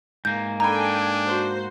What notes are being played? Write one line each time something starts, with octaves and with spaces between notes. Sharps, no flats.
G#2 A#3 G6
D4 A4 G5 G#5 A#5 B5
F#4 C5